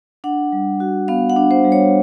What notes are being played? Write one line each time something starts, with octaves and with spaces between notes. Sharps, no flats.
D4 F#5
G3
F#4
B3 F5
F#5
D4
C5
G3
C#5